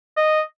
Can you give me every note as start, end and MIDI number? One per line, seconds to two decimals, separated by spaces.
0.17 0.41 75